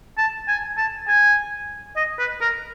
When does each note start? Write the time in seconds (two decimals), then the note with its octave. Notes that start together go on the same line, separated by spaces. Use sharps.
0.18 A5
0.48 G#5
0.78 A5
1.08 G#5
1.97 D#5
2.19 B4
2.41 A#4